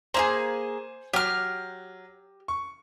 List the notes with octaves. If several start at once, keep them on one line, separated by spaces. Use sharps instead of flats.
A#3 E4 G#4 C5 G#5
F#3 G4 F6
C#6